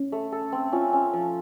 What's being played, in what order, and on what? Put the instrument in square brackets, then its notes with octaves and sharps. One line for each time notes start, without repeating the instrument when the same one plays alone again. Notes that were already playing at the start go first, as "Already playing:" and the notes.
Already playing: [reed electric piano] C#4
[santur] A3
A4
C4
[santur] C#4 [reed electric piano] F4
[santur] C#4
F3